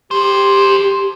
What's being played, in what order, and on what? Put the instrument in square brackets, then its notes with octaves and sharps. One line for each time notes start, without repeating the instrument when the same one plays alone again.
[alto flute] G4 [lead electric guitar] A4 C5